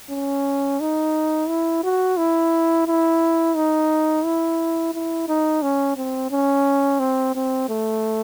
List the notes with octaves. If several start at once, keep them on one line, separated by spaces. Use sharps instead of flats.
C#4
D#4
E4
F#4
E4
E4
D#4
E4
E4
D#4
C#4
C4
C#4
C4
C4
A3